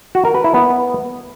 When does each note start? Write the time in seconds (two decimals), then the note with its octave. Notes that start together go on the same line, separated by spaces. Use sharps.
0.15 F#4
0.25 A#4
0.35 B4
0.44 E4
0.54 B3